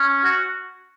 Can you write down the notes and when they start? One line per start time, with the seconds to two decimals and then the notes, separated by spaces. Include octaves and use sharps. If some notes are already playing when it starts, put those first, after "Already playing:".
Already playing: C#4
0.25 F#4